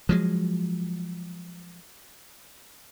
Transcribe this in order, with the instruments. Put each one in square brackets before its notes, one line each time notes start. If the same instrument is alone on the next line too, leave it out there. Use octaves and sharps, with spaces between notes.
[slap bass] F3 F#3 G#3